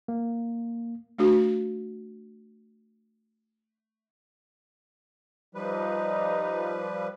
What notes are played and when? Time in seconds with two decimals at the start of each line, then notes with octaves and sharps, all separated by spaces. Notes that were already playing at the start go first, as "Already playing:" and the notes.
0.08 A#3
1.18 A3 D4 F#4
5.55 F3 G3 D#4 B4